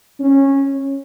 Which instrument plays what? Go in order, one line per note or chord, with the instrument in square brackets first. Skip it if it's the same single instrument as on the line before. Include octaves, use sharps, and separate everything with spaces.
[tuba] C#4